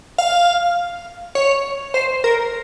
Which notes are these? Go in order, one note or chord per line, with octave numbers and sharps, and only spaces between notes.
F5
C#5
C5
A#4